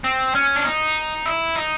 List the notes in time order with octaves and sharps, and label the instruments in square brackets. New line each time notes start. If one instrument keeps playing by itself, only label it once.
[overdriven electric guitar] C4
C#4
D4
D#4
E4
D#4